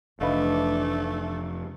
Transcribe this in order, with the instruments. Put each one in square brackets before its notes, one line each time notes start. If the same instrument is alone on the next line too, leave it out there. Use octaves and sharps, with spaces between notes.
[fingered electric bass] F1 [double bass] E3 D4 [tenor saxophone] A3 [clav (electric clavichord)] B4 D#5 F5